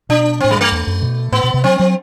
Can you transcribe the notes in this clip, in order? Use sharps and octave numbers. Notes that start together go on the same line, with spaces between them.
B2 D4
A2 C4
G3
G2
A3
E2
F#2
B2
A2 B3
B2
C3
F#3 C4
F#3